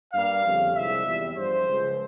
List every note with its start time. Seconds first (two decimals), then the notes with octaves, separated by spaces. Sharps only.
0.14 G2 G3 A#3 F5
0.45 G1 F2 C#3 G3
0.75 C2 C3 F3 G#3 E5
1.06 E2 C3 G3
1.37 G2 F3 G#3 C5
1.68 C#2 C#3 F3 G#3